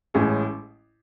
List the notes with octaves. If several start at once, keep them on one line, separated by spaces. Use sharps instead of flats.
A1 A2 G#3 C#4